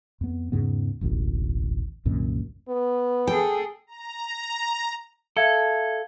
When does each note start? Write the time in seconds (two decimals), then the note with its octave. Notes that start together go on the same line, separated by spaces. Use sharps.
0.21 F2 B3
0.52 E2 G#2 C#3 B3
1.01 E1 A1 D2
2.05 C2 F#2 A#2 D#3
2.68 B3
3.27 G#4 A4 G5
3.87 A#5
5.37 A4 E5 F5 G#6